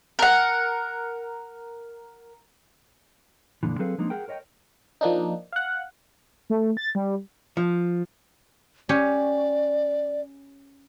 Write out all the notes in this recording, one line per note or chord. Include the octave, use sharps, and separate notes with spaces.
A#4 F#5
F2 A#2 D3 E3
F#3 C4 G#4 A4 B4 F5
F3 G#3 A#3 C4 D4 D#4
G#4 A#4 F#5 G5
A#4 C#5 D#5 E5 G5
F3 A#3 D4 D#4
F5 F#5
A3
A6
G3
F3
C#4 G4 C#5 D5